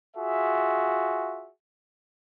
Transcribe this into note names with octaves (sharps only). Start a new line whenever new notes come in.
F4 F#4 G#4 E5